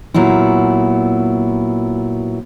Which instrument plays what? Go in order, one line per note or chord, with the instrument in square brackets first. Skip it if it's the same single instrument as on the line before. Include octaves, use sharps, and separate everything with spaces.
[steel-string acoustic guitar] A#2 F#3 B3 E4